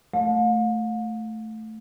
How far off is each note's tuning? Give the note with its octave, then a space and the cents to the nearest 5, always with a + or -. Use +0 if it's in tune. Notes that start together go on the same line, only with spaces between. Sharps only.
A3 +0 F5 +40